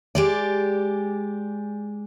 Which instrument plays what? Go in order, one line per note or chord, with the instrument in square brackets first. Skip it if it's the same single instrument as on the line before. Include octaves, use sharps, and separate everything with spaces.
[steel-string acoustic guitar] G#3 G4 D5